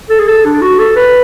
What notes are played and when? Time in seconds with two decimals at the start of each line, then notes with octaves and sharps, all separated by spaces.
0.10 A4
0.19 G#4
0.27 A4
0.45 D4
0.62 F#4
0.79 A4
0.96 B4